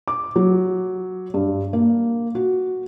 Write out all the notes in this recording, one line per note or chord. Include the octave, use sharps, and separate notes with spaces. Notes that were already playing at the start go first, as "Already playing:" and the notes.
D6
F#3
G2
A#3
F#4